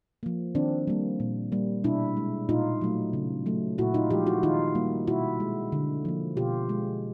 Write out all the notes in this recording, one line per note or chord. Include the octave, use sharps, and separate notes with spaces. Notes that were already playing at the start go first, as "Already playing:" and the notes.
F3 A#3
D#3 C4 D4
G3 A#3
A#2
G3 A#3
B2 D4 E4
G#3
A#2 D#4 F4
F#3 A3
C#3
F#3 A3
A#2 E4 F#4
D#4 F4
F3 G#3 F4 G4
E4 F#4
D#3 D#4 F4
G3 A#3
B2 E4 F#4
G#3
D3
F3 A#3
B2 F4 G4
G#3